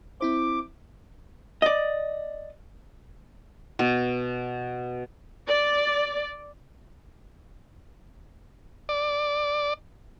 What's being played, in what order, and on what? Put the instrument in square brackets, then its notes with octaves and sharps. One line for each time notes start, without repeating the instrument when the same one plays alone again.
[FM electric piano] C4 E4 C5 [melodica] D6
[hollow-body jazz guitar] D5 D#5
[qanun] B2
[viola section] D5
[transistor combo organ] D5